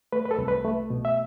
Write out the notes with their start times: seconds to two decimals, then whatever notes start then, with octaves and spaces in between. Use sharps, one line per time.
0.12 A3 B4
0.26 B4
0.31 A4
0.38 C2
0.48 B4
0.65 A3
0.90 B2
1.05 E5